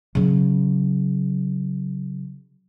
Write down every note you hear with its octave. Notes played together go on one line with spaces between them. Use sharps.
C#3 F#3